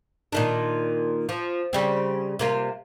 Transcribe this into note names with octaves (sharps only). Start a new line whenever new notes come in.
A#2 D#3 D4
F3
C#3 G3 C4
C3 A#3 F4